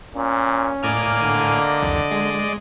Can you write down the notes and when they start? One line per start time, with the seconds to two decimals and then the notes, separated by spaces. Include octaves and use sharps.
0.16 A#2 C#4
0.83 A2 A#3 D5 D#5 G#5 F6
1.22 D3
1.82 C2 F2
2.11 G#3